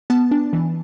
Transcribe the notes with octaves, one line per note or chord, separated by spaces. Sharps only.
B3 A5
D4
E3